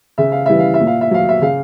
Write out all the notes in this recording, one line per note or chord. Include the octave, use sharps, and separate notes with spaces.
C#3 E5
F5
E3 G3 E5
F5
E5
A#2
F5
E5
F#3 F5
E5
C#3 F5